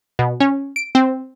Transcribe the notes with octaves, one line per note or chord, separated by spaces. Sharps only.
B2
C#4
D7
C4